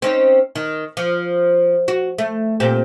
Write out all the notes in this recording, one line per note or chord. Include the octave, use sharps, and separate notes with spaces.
C4 C#4 D#4
D#3
F3
F#4
A3
A#2 C4 G4